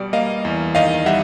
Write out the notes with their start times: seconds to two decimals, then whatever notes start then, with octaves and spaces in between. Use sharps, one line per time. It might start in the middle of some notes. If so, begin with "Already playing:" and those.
Already playing: B2 G3 D5
0.13 A#3 D#5 F5
0.45 E2
0.75 D#3 D#5 F5
1.06 G3 E5 F#5